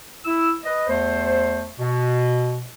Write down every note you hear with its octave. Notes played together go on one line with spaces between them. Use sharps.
E4 E6
B4 D#5
E2 A3 C5
B2